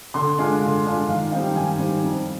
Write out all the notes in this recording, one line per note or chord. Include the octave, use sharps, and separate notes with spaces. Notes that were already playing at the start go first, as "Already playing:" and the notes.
D3 C6
G#3 D4 F4
D3
G#3 D4 F4
D#3 F5
G3 C4 D#4 G5
D#3 G#5
G3 C4 D#4
F2